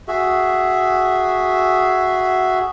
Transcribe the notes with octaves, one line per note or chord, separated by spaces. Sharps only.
F#4 G#4 E5